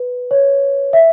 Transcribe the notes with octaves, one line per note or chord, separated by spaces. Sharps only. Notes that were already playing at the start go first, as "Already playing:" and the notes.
Already playing: B4
C#5
E5